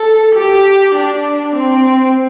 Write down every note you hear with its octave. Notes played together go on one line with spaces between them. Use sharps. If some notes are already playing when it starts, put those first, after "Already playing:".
Already playing: A4
G4
D4
C4